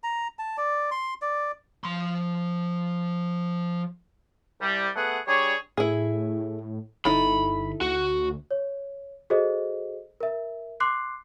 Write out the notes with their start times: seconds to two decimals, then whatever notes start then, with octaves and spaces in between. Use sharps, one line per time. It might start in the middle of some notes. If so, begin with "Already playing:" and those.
0.04 A#5
0.39 A5
0.58 D5
0.91 C6
1.22 D5
1.84 F3 C6
4.60 C2 G3
4.96 A3 B3 G#4 F#5
5.27 G3 D4 G#4 C#5
5.77 A2 E4 G#4
7.05 G1 D#4 E4 A4 B5
7.81 D2 F#4
8.51 C#5
9.30 F#4 G#4 A4 C5 D#5
10.20 A#4 E5
10.80 C6 D6 F#6 C7